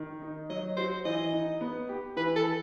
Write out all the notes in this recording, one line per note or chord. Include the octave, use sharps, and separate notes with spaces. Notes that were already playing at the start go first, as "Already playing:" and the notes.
Already playing: D#3
D#4
F#3 D#5
F#4 C5
E3 D#5
D#4
B3
G4
E3 B4
A4